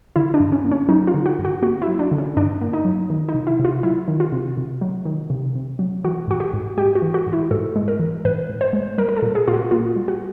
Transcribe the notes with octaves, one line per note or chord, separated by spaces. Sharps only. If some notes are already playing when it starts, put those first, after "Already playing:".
D3 E4
D4
G2
C#4
A#3
C#4
F#3 D#4
F4
D3
F#4
G2
F#4
A#3 F#4
E4
F#3
D4
D3
C#4
G2 D4
A#3
D#4
F#3
D#3
D#4
C3
E4
C3
F4
F#3 E4
D#3
F4
C3
C3
F#3
D#3
C3
C3
F#3
E3 F#4
G#2 F#4
G4
G#2
G#3 G4
F#4
E3
F#4
G#2
E4
G#2 A4
G#3
A#4
E3
G#2 B4
G#2
C5
G#3
G3 A#4
A#4
A4
A#2
G#4
A#2 F4
F#4
A#3 F4
G3
F#4